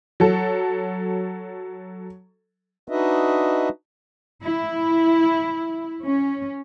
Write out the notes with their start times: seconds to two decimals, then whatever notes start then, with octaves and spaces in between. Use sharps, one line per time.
0.20 F#3 A4
2.88 D4 D#4 F#4 B4 D#5 E5
4.43 E4
6.04 C#4